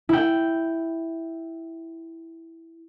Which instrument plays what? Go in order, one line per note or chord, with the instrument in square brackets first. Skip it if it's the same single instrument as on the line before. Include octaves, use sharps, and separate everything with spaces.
[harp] E4 G5